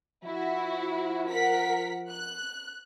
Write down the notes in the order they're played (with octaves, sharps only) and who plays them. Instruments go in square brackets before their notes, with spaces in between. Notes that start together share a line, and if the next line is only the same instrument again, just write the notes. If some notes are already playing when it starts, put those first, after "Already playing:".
[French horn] F3 [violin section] E4 F#4
[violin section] A#4 F#5 B6
F#6